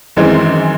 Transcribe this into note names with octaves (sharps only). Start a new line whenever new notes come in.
F#2 D#3 E3 G#3 C4